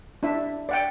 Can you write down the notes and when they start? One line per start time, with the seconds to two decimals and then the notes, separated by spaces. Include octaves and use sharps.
0.23 D4 E4 E5
0.69 D5 F#5 G5